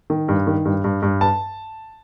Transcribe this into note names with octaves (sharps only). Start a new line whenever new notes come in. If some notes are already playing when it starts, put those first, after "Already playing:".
D#3
G2
D#3
G2
G2
G2
A5